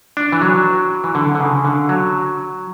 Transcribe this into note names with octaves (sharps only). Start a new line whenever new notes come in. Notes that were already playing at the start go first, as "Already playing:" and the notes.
D4
E3
F#3
E3
D3
D3
C#3
D3
F#3